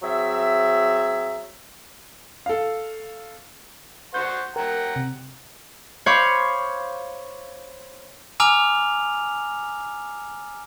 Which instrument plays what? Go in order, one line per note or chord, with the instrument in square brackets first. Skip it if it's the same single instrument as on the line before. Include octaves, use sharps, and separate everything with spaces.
[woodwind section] F#3 C4 G#4 E5
[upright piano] A4 F5
[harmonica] C5 F#5 C#6 [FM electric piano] G6
[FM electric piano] A#4 [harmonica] F#5 G5 A#5
[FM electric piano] C3
[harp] C5 C#5 F5 B5 C#6 D6
[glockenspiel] G#5 A#5 D6 E6 F6 F7